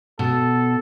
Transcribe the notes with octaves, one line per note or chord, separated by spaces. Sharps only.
B2 A4